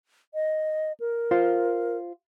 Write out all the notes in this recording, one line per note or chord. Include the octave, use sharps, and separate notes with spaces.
D#5
A#4
F4 C5